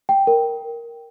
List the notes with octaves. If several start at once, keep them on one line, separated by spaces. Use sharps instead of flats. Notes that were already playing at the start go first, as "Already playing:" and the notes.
G5
A#4